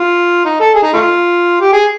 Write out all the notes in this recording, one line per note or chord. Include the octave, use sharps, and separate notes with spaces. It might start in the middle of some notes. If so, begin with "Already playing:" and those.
Already playing: F4
D#4
A4
G#4
D#4
A3 F4
G4
G#4